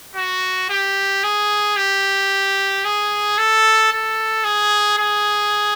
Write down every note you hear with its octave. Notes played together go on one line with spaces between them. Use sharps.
F#4
G4
G#4
G4
G#4
A4
A4
G#4
G#4